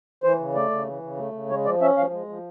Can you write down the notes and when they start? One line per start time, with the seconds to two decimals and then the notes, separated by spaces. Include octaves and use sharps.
0.24 E3 C5
0.40 C#3
0.55 A3 D5
0.71 C#3
0.86 E3
1.02 C#3
1.18 A3
1.34 C#3
1.50 G#3 C#5
1.65 F3 D5
1.81 C#4 E5
1.97 F3 F5
2.13 G#3
2.29 F3